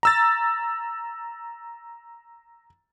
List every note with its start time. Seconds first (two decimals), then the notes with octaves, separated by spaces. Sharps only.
0.03 A#5 E6 A6